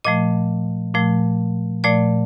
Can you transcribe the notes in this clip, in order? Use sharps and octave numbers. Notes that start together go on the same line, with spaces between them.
A#2 F3 A3 D#5
A#2 F3 A3
A#2 F3 A3 D5